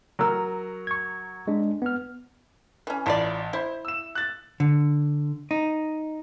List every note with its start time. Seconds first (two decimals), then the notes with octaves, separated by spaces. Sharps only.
0.19 F#3 A#4 E6
0.87 C#6 G#6
1.47 G#3 D4
1.82 B3 F6
2.87 E3 C#4
3.06 A1 E4 F4 D5 A5
3.53 E4 C5
3.85 E6 E7
4.15 F#6 A6
4.60 D3
5.51 D#4